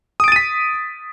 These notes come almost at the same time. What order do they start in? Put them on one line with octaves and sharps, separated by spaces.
D#6 D7 A6 D#7 B6